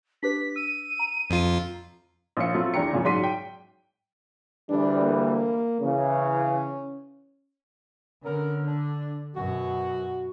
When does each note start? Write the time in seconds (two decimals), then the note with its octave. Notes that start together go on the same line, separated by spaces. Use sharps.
0.23 D4 G4 B4 B6
0.56 E6 D#7
0.99 A#5
1.30 F2 F4
2.37 A#1 C#4 F5 C#7
2.54 F#3 A3 C4 F4
2.74 E2 D4 E4 G5 A#5 C#7
2.92 F#2 A#2 C#3
3.04 G#2 F#3 D5 C6 B6 D#7
3.23 G5
4.70 D2 E3 G3 D4
5.02 A#3
5.81 C#3 E3 C#4
8.24 D3 B3 C#4 A#4
8.67 D4
9.35 F#2 B2 F#4